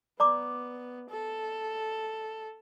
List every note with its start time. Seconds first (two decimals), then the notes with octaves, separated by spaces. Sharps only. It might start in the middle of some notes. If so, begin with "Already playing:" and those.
0.20 B3 D5 A#5 D6
1.10 A4